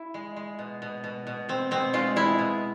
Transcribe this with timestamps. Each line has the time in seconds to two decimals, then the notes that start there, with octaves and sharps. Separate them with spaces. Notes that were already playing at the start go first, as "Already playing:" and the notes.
Already playing: E4
0.14 G#3
0.37 G#3
0.59 B2
0.82 B2
1.04 B2
1.27 B2
1.49 B2 C4
1.71 B2 C4
1.93 G#3 F4
2.16 G#3 E4
2.39 B2